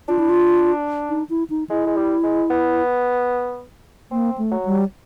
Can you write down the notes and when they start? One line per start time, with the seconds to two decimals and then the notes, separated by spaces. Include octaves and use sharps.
0.08 D4 F4
0.19 E4
0.29 F4
1.09 D#4
1.30 E4
1.50 D#4
1.70 G#3 E4
1.87 G#3
1.97 G3
2.23 G#3
2.50 B3
4.11 A#3 C4
4.38 A3
4.51 F#3
4.65 G3